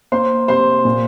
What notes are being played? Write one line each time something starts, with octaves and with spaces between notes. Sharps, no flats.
A#3 C5 C6
C3 C5 C6
A#2